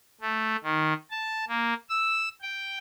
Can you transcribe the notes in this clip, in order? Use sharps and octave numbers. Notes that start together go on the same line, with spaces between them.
A3
D#3
A5
A#3
E6
G5